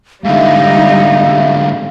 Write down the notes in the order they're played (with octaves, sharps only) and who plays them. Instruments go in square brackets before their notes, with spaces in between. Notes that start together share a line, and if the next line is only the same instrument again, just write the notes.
[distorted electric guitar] G#2 D3 [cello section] G3 D#4 [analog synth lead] E5 [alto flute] F5